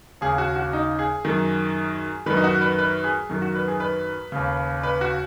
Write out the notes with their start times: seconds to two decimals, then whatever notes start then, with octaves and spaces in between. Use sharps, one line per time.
0.21 D#2 C#3 G#4
0.38 F#4
0.56 F#4
0.73 D#4
0.99 G#4
1.25 F#2 D#3
2.26 F#2 D#3 B4
2.37 D#4
2.44 F#4
2.61 B4
2.79 B4
3.04 G#4
3.29 F#2 D#3
3.42 F#4
3.55 B4
3.68 G#4
3.80 B4
4.32 D#2 C#3
4.83 B4
5.01 F#4